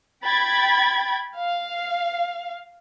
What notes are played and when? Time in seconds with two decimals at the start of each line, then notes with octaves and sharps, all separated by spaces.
0.22 G5 B5 G#6 A6
1.37 F5